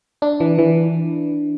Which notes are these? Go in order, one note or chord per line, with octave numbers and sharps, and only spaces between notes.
D4
E3
E3